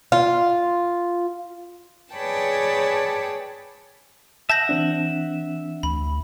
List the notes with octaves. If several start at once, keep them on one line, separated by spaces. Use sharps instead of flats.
F4
G#4 B4 C#5 D5 G5 A5
E5 F#5 A5 G6 A#6
E3 C4 D4
D2 B5